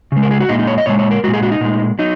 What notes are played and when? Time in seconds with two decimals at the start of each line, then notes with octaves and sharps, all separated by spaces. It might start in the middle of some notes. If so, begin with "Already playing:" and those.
0.12 C#3 G#3
0.23 A#4
0.31 G#4
0.40 F#4
0.49 A#2 G#3 D#4
0.59 D#4
0.67 C#5
0.78 D#5
0.86 A#2 G#3 C#5
0.99 C#5
1.11 A#4
1.24 G#3 F#4
1.28 A#2
1.34 G#4
1.43 F#4
1.51 D#4
1.61 A#2 G#3
1.99 F#3 D#4